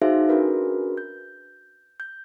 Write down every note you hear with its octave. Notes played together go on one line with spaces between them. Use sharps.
D#4 F#4 G#4 C5 E5 F5
C#4 D4 F#4 G#4 A#4 B4
G6
G6